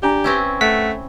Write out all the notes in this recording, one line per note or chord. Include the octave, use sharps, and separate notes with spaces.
D4 G4 G#5 A#5
C4 C#4 E4 B4
A3 F#5 B6